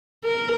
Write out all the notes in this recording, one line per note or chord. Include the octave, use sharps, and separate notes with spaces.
A#4